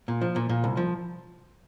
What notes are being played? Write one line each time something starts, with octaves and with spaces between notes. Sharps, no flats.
A#2
F3
A#2
A#2
C2
F3